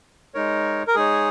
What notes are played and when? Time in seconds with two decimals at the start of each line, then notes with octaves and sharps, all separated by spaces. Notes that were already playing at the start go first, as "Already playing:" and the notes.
0.34 G#3 D#4 A#4 C#5
0.88 A#4
0.95 G#3 D#4 G#4 C#5